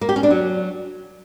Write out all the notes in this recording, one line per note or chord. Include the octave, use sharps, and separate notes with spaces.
A#3
G4
C#4
D4
F#3